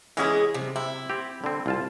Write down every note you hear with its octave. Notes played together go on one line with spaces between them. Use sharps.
E3 G#3 B3 C#4 E4 G#4
C3
C3 E4
C4 G4
D3 C4
C2 F4 A5